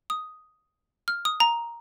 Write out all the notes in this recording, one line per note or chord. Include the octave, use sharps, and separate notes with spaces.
D#6
F6
D#6
A#5